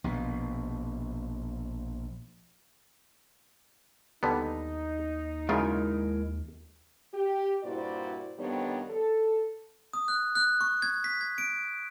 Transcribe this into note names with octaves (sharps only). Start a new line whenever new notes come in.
A#1 B2
D#2 D3 G3 B3 D#4
F#2 C#3 G#3 E4 F4 A#4
G4
G2 A#2 E4 F#4 C5 D5
F2 D#3 G3 B3 D4 C#5
A4
D#6
F#6
F#6
C#6
G#6
B6
G#6
D7